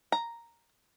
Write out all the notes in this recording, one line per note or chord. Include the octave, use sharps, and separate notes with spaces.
A#5